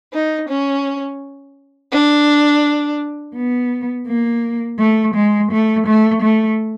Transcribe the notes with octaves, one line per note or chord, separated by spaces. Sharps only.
D#4
C#4
D4
B3
A#3
A3
G#3
A3
A3
A3